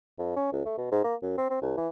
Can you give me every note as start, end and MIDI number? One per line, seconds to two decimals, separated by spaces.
0.19 0.35 41
0.36 0.48 61
0.52 0.61 37
0.65 0.76 57
0.78 0.91 47
0.92 0.99 44
1.04 1.15 58
1.22 1.36 42
1.38 1.46 60
1.50 1.60 60
1.62 1.75 36
1.77 1.88 52